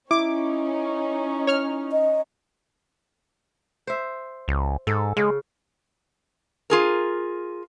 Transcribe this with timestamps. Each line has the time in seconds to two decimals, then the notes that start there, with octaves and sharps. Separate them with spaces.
0.11 C#4 D#4 E4 D6
1.47 C#5 F6
1.92 D#5
3.87 C5 E5
4.48 C#2
4.87 G#2 A4
5.17 C#3 G#3
6.70 F4 G#4 A#4